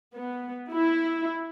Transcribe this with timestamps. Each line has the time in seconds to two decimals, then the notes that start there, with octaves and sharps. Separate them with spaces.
0.16 B3
0.71 E4